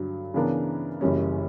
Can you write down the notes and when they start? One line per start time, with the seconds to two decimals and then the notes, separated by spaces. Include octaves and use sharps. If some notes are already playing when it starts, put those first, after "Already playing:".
Already playing: G2 D3 F#3
0.34 C#3 E3 B3 D4 A#4
1.01 F#1 F#2 E3 G3 C#4